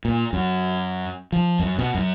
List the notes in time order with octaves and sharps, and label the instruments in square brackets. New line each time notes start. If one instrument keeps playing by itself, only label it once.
[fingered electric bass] A#2
F#2
F3
F#2
B2
F#2